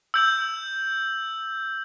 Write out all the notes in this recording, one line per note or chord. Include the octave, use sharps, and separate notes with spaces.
E6 G6 F#7